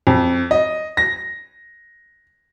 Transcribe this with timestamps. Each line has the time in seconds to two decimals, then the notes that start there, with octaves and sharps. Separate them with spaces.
0.07 F2
0.51 D#5
0.97 A#6